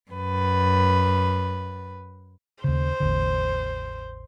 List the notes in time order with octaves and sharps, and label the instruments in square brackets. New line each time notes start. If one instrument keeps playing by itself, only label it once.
[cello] F#2 B4
[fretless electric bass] D#2 C#3 [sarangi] C5
[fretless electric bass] A1 E2 D3